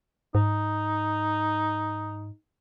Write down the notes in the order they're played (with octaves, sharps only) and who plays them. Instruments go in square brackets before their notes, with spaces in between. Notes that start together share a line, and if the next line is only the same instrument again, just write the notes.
[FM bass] G#2 [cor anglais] D#4